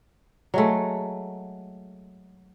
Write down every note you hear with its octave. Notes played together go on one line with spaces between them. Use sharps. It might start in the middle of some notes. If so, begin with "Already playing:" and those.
F#3 G#3 A3